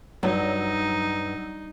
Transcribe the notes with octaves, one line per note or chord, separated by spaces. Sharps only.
G2 F#3 D#4